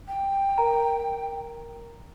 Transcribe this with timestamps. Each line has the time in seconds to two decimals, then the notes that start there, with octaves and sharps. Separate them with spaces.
0.08 G5
0.58 A#4 A#5